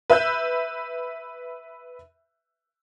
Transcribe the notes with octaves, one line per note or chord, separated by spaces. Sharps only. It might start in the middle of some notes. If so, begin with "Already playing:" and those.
B4 E5 E6 F#6 G6